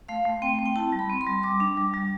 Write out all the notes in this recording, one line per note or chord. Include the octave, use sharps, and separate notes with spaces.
A3 F5
A3
C4 G5
C4
G5
E4 A5
G3
B5
C4
C6
G3
G3 D6
D4
G3
G3